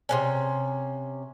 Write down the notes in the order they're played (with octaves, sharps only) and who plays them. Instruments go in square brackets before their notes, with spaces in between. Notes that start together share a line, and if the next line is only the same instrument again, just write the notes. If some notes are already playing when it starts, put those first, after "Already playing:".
[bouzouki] C3 B3 C#4